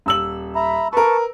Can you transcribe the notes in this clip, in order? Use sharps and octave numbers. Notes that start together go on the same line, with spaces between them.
D#1 E6 F#7
E5 A#5 B5
A#4 B4 A5 C#6